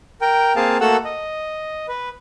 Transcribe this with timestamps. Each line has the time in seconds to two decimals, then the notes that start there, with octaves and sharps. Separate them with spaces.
0.21 A#4 G5
0.56 A#3 C4 G#4 F5 A5
0.81 A3 A#3 F#4 A4 F#5 E6
1.05 D#5
1.88 B4